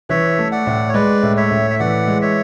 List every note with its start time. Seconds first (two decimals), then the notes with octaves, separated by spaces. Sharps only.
0.09 E3 C#5 E5
0.38 A3
0.52 D5 F#5
0.67 A2
0.89 C#5
0.94 G#3 B4 D5
1.23 A2
1.37 C#5 E5
1.51 A2
1.70 E5
1.80 E3 D5 F#5
2.07 G#3
2.22 C#5 E5